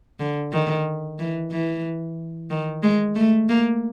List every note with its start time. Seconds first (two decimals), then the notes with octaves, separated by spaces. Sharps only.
0.20 D3
0.53 D#3
1.19 E3
1.51 E3
2.50 D#3
2.83 G#3
3.15 A3
3.49 A#3